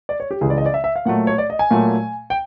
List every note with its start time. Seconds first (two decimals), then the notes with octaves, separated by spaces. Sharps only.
0.09 D5
0.20 C#5
0.31 G4
0.41 C#2 C#3 E3 G#3 G#4
0.50 D5
0.58 D#5
0.66 D5
0.74 E5
0.84 E5
0.96 F5
1.06 A#2 F#3 A3 F#5
1.27 C#5
1.38 D5
1.50 D#5
1.59 G#5
1.71 A#2 F#3 A3
2.30 G5